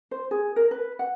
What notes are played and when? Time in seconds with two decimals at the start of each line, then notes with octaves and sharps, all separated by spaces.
0.11 C5
0.31 G#4
0.56 A#4
0.71 B4
0.99 F#5